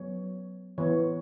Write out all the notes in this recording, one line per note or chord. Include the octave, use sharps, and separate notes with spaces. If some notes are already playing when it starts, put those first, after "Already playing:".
Already playing: F#3 B3 C#5
E3 B3 C#5